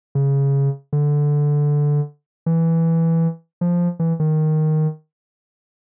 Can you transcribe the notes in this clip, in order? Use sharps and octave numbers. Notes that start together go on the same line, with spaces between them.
C#3
D3
E3
F3
E3
D#3